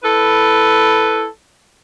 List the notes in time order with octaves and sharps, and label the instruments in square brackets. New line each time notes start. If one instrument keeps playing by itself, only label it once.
[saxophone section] E4 A4 B4